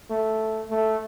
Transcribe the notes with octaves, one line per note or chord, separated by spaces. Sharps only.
A3
A3